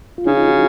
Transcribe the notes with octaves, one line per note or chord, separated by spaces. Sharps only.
F4
C#3 D4 E4
D#4 F4
E4 F#4